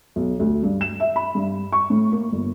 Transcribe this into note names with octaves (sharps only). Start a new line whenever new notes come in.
B1
D2
G2
E7
E5
B5
G2
C#6
A2
A#3
G1